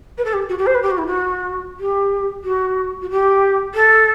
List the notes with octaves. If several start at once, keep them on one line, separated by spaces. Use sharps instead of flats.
B4
A4
G4
F#4
G4
C5
B4
G4
F#4
E4
F#4
G4
F#4
F#4
G4
A4